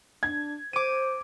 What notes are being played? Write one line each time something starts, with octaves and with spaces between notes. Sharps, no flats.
D4 G#6
C5 D6 D#7